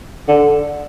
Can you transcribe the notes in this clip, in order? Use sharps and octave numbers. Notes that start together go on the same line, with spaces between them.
D3